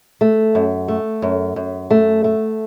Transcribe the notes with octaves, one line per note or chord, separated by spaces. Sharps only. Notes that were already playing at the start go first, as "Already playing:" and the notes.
A3
F#2
A3
F#2
F#2
A3
A3